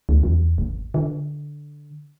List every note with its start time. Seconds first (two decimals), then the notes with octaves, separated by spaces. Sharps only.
0.09 D2
0.23 E2
0.58 G#1
0.94 D3